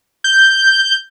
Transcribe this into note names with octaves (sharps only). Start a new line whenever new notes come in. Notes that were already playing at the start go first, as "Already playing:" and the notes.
G6